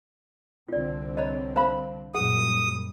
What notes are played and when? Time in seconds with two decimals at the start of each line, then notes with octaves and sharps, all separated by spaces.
0.69 C2 D3 C4 F4 D5
1.17 B4 C#5 D#5 A#5 B5
1.56 C5 F5 A5 B5
2.14 F#2 A#2 G3 G#4 F#5 D#6